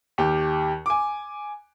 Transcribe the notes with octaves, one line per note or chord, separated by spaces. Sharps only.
D#2 G4
G#5 D6